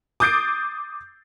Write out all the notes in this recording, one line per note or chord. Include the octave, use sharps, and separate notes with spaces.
D6 D#6 G6 A6 C7 D7